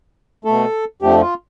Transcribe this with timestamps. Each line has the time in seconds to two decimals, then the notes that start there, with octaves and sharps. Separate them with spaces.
0.45 B2 A3 A4
1.02 F2 D3 F3 A3 G4
1.21 F4